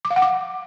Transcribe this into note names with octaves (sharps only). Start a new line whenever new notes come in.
D6
F5
F#5
D6